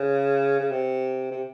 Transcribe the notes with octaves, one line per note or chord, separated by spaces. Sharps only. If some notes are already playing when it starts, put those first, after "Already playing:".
Already playing: C#3
C#3
C3
C3